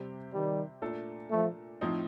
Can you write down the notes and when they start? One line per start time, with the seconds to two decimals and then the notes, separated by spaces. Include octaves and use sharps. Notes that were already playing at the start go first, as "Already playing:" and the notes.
Already playing: C3 G3 C4 G4 C5
0.32 D#3 G3
0.82 A#2 A3 D4 A4
1.31 F3 A3
1.81 A2 F3 C4 D#4